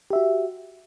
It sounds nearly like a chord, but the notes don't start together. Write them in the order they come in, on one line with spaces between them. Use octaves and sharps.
G4 E5 F#4